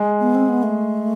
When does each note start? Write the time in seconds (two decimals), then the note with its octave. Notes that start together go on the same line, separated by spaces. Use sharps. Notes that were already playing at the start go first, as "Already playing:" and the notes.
Already playing: G#3 G#4
0.20 B3
0.35 C4
0.48 B3
0.63 A3